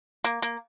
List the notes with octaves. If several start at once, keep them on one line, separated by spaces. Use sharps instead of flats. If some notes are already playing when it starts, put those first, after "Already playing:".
A#3
A#3